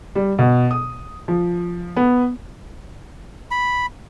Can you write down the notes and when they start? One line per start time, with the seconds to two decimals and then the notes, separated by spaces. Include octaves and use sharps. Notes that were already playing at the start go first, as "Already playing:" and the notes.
0.15 G3
0.39 B2
0.71 D#6
1.28 F3
1.96 B3
3.51 B5